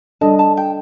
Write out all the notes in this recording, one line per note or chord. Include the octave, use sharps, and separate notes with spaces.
G3 D4 A4 D#5 A5
A5
G5